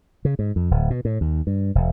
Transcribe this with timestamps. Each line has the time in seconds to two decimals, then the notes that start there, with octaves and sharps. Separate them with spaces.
0.25 C#3
0.39 G#2
0.56 F2
0.71 D1
0.90 B2
1.05 A2
1.21 D#2
1.47 G2
1.75 E1